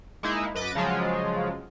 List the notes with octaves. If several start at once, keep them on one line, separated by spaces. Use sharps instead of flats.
G#3 A#3 D#4 E4
F#2 B4 D#5 D6 A6
C#3 F3 F#3 G#3 F4